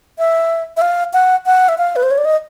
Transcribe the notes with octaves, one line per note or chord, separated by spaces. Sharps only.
E5
E5
F5
F#5
F#5
E5
F5
B4
C5
C#5
D5
D#5